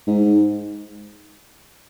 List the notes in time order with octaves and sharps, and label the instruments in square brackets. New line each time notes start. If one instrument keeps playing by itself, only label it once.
[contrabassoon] G#2